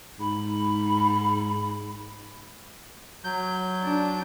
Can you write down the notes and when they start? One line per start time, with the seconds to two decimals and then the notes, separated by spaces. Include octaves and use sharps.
0.19 G#2 B5
3.24 F#3 G6
3.82 D4